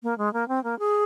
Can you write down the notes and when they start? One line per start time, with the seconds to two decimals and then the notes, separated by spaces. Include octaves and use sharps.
0.03 A#3
0.18 G#3
0.33 A#3
0.48 C4
0.64 A#3
0.79 G#4